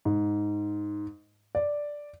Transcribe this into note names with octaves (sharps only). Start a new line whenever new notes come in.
G#2
D5